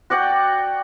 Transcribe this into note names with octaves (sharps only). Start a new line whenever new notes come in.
F#4 D5 F#5 G5